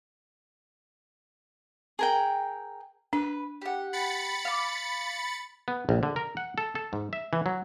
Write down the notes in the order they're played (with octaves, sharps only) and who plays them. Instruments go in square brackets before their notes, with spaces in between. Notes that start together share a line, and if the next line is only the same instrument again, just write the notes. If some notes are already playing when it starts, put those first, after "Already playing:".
[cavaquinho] G#4 A#4 G5
[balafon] D4 [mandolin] B4
[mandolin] G4 F#5
[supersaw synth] B5 A6 C#7
[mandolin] F5 D6
[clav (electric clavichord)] B3
A#1
D3
A#4
F#5
A4
A4
G#2
E5
E3
F#3